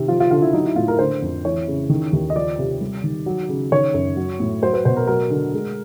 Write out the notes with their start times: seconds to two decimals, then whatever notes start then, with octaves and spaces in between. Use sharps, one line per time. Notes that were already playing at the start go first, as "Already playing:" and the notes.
Already playing: C3 D#3
0.08 F3 F4
0.20 F4
0.31 D3 F4
0.42 E4
0.53 F#3 D#4
0.65 E4
0.76 A2 F4
0.88 A#4
0.99 D3 C5
1.22 F2
1.45 E3 C#5
1.68 C#3
1.89 D#3
2.13 D#2
2.30 D#5
2.35 F3 D5
2.59 C3
2.81 G3
3.04 D#3
3.26 F#3
3.49 C#3
3.72 D#3 C#5
3.94 F#2
4.17 F#3
4.40 A2
4.62 F#3 C5
4.73 B4
4.85 B2 C5
4.97 A#4
5.07 F#3 A#4
5.30 D3
5.54 G#3